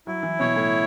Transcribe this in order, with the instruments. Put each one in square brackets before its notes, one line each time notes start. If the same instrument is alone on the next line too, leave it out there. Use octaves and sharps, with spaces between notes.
[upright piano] F#3 [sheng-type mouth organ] E4
[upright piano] E3
[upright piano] B2 [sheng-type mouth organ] C#5
[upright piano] A2